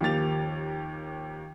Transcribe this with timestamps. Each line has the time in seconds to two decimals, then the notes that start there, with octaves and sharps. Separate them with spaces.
0.01 D#2 F3 A#3 G4 A6 F7